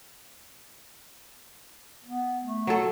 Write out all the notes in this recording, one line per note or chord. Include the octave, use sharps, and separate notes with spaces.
B3
A3
F#3 A4